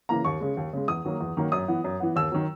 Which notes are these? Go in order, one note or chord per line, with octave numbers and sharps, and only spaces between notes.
C#3 E3 A#3 A#5
D#2 C#6
C#3 G#3
D#2
C#3 G#3
E2 D#6
D#3 F#3 A#3
E2
D#3 F#3 A#3
F#2 D#6
E3 B3
F#2
E3 B3
D#2 E6
D#3 F#3